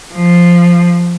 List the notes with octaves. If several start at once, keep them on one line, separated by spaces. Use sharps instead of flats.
F3